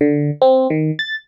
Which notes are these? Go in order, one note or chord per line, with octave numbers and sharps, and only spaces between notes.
D3
C4
D#3
A6